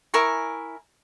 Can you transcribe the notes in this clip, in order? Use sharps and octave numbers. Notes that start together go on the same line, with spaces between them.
E4 A#4 G#5 C#6